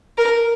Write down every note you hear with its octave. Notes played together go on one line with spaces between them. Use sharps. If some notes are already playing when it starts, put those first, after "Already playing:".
A#4